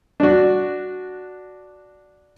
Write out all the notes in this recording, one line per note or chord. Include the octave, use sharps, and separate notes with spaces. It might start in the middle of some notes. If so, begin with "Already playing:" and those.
D4 F#4